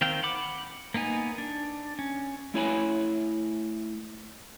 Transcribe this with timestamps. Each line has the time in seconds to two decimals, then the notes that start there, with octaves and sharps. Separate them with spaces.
0.01 D#3 C4 F5 G5
0.23 F#5 B5 D6
0.94 A#3 B3 D#4 G#5
1.38 D4
1.99 C#4
2.54 A3 E4 C#5 G#5 B5